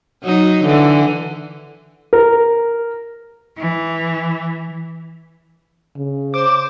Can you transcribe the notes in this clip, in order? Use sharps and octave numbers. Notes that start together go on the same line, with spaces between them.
F#3 D#4
D3 E3
A#4
E3
C#3
C5 D6